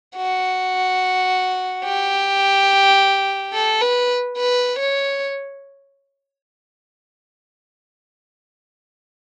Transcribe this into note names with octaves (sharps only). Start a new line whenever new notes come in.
F#4
G4
A4
B4
B4
C#5